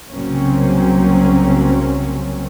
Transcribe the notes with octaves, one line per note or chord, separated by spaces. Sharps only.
C2 C#3 F#3 A#3 C4 C#4